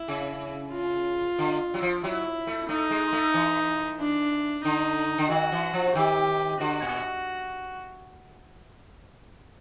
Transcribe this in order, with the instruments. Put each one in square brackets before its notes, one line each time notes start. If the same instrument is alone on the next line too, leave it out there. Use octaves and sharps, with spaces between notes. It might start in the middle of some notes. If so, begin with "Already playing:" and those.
Already playing: [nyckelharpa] E4
[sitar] C#3
[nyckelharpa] F4
[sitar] D3
F#3
F3
[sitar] F#3 [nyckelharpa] E4
[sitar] A3
[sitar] A3 [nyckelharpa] D#4
[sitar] G#3
A3
E3
[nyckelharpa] D4
[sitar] D3 [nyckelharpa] D#4
[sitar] D3
[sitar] D#3 [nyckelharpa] F#4
[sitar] E3
F3
[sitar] D#3 [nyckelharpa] G4
[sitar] D3 [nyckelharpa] F#4
[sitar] A#2